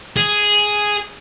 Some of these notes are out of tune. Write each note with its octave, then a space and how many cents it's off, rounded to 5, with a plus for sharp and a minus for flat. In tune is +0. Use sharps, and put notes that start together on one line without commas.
G#4 +0